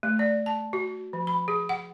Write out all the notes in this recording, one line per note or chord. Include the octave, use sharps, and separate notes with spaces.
A3
D5
A5
F#4
F3
B5
G#4
F#5